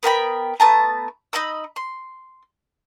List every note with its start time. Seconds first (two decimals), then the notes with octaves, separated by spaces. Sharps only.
0.03 B3 A#4 G5 B5
0.60 A3 B3 A5 A#5
1.33 D#4 D#5 B5 E6
1.76 C6